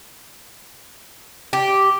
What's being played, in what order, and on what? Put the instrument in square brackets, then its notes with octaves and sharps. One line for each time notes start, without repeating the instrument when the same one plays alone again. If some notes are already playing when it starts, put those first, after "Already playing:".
[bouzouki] G4